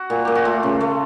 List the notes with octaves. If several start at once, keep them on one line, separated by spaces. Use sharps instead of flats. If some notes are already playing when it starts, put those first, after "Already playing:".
Already playing: F#4
A#2
A#2 G4
F#4
A3 F4
C#3
A3